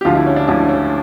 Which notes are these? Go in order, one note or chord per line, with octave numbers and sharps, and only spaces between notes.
G4
D2 D3 F3 F4
E4
C#4
D4
D2 D3 F3 E4
C#4